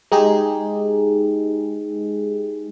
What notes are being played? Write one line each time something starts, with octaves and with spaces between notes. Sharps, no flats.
G#3 D#4 G4 G#4